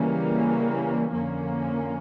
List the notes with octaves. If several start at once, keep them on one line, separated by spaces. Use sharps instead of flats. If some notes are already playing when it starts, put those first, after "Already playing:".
Already playing: C#3 E3 G3 A#3 C#4
F2 D3 F3 A#3 C#4